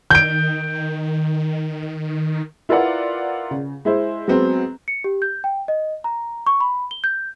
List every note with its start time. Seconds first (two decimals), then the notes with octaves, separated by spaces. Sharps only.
0.11 D#3 G6 D7
2.69 E4 F4 A#4 B4 D5 F#5
3.51 C#3
3.85 G#3 E4 C5
4.28 F#3 G#3 B3 C4
4.88 C#7
5.04 G4
5.22 G6
5.44 G5
5.68 D#5
6.04 A#5
6.46 C#6
6.61 B5
6.91 G7
7.04 G6